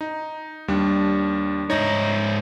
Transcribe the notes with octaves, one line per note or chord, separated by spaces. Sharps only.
D#4
D#2 G3 D4
G#2 D#4 C#5 A#6